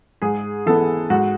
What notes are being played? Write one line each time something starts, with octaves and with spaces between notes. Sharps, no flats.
G#2 G#4
E3 B3 A4
G#2 F#4